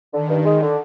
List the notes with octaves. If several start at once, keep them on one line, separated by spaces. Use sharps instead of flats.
D3 D#3
G2
G#3
D3